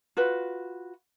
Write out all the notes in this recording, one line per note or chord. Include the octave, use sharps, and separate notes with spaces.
F4 F#4 B4